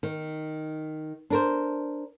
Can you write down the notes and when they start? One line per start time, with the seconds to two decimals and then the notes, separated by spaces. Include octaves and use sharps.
0.03 D#3
1.30 D4 A#4 C5